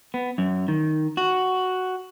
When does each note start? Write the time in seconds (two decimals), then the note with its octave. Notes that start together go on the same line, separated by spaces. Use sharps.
0.14 B3
0.38 F#2
0.68 D#3
1.17 F#4